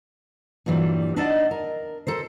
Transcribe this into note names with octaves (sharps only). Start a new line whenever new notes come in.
G2 A#2 E3 F#3 G3
D4 D#4 D#5 E5 F#5 A5
A#4
A4 A#4 C5